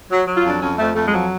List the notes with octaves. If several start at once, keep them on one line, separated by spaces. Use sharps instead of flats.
F#3
F#3
F4
F2 D4
F2 C#4
F2 A3
F2 A3
G#3
F3 F#3